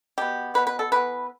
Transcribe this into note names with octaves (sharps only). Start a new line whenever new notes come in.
B2 B3 G4
B2 B3 B4
B4
A4
E3 B3 B4